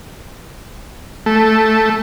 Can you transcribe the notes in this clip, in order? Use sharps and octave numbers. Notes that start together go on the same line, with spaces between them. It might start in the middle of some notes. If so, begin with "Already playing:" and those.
A3